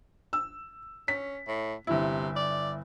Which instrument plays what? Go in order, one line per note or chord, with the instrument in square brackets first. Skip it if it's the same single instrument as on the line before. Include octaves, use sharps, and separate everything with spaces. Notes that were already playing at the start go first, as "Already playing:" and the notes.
[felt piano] E6
[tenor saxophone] C#4 [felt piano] B6
[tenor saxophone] A2
[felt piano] G1 E4 [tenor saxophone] C3
[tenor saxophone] D5